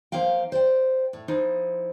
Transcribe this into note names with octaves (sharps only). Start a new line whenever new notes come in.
F3 A#3 D#4 F5 G5
C5 D5 G5
A2
F3 D#4 E4